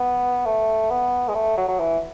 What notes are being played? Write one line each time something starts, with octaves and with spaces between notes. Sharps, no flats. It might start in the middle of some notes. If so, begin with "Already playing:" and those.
Already playing: B3
A3
B3
G#3
A3
F#3
F#3
E3